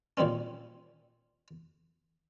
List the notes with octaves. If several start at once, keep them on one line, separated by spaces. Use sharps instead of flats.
A#2 D#3 G3 C4 C#4